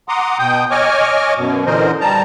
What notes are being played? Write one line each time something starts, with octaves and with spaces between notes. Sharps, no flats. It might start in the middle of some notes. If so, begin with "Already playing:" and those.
F#5 A#5 C6 D6 D#6
B2 G5 D#6 G6
C#5 D#5 G#5 C#6 D6 F6
F#2 B2
A#2 D3 E3 A#4 C5 D#5
G3 A5 A#5